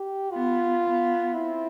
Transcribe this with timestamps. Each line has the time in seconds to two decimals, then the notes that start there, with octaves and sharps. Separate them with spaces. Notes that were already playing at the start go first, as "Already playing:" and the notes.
Already playing: G4
0.32 B3 F4
0.83 B3
1.33 C4 E4